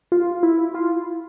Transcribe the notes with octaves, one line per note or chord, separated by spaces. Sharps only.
F4
E4
F4